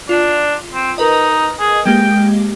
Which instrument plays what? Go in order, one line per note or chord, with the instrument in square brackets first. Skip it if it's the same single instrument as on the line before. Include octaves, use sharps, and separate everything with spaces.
[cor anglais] D4 [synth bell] F4
[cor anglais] C4
[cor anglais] D#4 [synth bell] A#4 B4 D#5
[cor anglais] G#4
[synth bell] G#3 A#3 G4 [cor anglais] G5